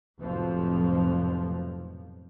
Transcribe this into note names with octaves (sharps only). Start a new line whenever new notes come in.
F1 B1 F2 A2 F3